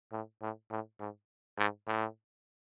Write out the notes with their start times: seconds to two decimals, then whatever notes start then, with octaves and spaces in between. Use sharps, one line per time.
0.12 A2
0.42 A2
0.71 A2
1.00 G#2
1.58 G#2
1.87 A2